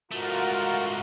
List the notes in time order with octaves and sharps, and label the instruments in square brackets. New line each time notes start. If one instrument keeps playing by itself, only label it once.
[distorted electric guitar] G#2 A3 [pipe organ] F4 F#4 A#4